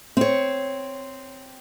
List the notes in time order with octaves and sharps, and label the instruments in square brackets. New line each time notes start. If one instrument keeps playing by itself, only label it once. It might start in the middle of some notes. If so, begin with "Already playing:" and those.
[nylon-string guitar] C4 C#5